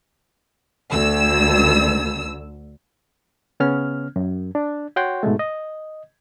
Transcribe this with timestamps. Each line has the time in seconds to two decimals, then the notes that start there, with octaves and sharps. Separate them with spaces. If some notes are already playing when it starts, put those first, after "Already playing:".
0.92 D2 E6
3.60 C#3 B3 C#4 F6
4.16 F#2
4.55 D4
4.96 F#4 C#5 F#5 G5 C6
5.23 G#2 B2 G#3 A3
5.39 D#5